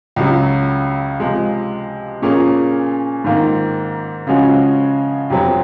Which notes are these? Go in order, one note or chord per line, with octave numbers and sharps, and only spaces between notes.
C#2 C#3 F#3
C3 F3 G#3
A#2 F3 A#3 C#4 G#4
G#2 D#3 A#3 F4
C#3 F3 G#3 C#4 F#4
F2 C3 F#3 C4